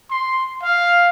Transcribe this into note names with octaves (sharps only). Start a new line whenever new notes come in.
C6
F5